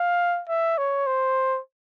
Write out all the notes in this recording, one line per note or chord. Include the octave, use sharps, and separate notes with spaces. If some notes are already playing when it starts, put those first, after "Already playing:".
Already playing: F5
E5
C#5
C5